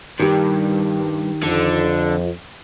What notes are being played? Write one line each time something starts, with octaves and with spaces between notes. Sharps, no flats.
G2 D#3 G4
F2 D3